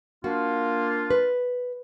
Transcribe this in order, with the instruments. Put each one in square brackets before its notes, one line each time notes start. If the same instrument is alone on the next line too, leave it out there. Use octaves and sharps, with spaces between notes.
[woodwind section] A#3 D4 F4 [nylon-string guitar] F#4
[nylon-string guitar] B4